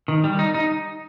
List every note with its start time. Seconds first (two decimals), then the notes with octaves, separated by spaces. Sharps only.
0.08 D#3
0.24 G3
0.39 D#4
0.54 D#4